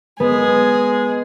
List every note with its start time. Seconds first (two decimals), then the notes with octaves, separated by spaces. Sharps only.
0.20 G#3 B3 G#4